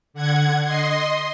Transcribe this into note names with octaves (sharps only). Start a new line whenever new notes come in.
D3 F#5 G#6
D#5 C6